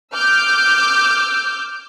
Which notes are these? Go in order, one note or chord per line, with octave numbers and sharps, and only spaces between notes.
D6 E6 F6 G6